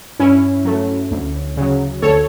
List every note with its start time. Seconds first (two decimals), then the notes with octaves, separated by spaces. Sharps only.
0.19 G2 C#4 E4
0.65 F#3 A3
1.11 D2
1.57 C#3 F#3
2.02 D2 A4 C#5